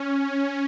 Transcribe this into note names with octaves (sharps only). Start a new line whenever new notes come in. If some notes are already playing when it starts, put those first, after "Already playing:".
Already playing: C#4